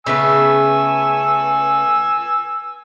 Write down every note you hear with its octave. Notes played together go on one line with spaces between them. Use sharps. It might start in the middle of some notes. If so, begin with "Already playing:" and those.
C#3 A3 B3 G#5 E6